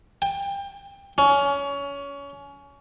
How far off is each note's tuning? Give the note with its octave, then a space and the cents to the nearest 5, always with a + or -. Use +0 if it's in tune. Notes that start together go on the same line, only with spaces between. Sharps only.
G5 +25
C#4 +25